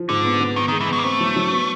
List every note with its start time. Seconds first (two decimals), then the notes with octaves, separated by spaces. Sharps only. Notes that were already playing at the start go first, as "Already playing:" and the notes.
Already playing: F3
0.09 G#2 D3
0.25 B3
0.40 B3
0.56 D#3 B3
0.68 D#3
0.72 G#3
0.81 E3
0.89 F#3 B3
0.98 A#3
1.04 A3 C4
1.20 F#3
1.36 F#3
1.51 B3